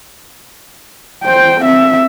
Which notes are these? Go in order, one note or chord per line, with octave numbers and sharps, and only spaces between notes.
C5 G5
C4 E5